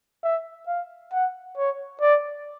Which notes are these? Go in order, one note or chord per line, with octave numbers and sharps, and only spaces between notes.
E5
F5
F#5
C#5
D5